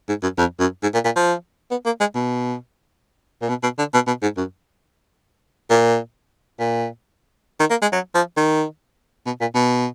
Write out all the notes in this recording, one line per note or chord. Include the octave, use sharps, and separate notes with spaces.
G#2
F#2
F2
F#2
G#2
A#2
A#2
F3
B3
A#3
G#3
B2
A#2
B2
B2
D3
B2
B2
G#2
F#2
A#2
A#2
D#3
A#3
G#3
F#3
F3
D#3
B2
A#2
B2